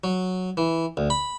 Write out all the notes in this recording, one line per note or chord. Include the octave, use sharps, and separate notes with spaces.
F#3
E3
D2
B5